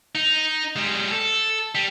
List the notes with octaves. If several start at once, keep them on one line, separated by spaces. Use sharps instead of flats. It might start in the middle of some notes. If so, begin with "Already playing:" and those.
D#4
G3 G#3
A4
G3